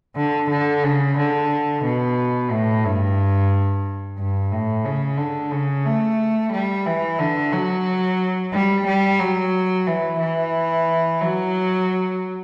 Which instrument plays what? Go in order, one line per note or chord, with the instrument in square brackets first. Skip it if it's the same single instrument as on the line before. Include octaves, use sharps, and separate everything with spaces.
[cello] D3
D3
C#3
D3
B2
A2
G2
G2
A2
C#3
D3
C#3
A3
G3
E3
D3
F#3
G3
G3
F#3
E3
E3
F#3